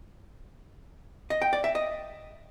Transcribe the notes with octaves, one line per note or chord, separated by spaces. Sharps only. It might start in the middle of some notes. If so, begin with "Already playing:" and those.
D#5
G5
D5
E5
D#5